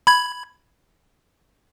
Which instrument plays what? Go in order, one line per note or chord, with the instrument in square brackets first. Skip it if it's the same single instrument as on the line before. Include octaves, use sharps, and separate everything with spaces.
[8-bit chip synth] B5 G#6